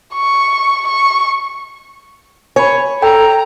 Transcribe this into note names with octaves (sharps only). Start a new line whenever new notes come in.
C#6
C#6
C#5 G#5 B5
A4 G5 A#5